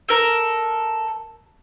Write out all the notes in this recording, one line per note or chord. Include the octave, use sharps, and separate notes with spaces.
A4 A#4